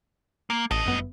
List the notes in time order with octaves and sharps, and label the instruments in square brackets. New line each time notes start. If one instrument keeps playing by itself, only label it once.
[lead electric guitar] A#3 [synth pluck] D6
[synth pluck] A1 A5 D7 [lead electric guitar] D2 D#5
[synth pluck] G1 F#2 B3